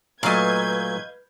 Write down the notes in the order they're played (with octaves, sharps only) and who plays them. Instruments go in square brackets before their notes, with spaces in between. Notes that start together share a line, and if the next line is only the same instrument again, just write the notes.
[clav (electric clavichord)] A#2 F#3 A3 [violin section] B4 G6 G#6 [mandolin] D#5 F5